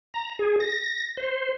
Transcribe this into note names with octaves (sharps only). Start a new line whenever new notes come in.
A#5
G#4
A#6
C5